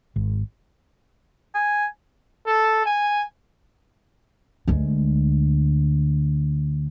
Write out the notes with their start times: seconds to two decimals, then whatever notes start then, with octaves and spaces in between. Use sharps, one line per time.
0.16 G#1
1.55 G#5
2.46 A4
2.86 G#5
4.68 D2 G#3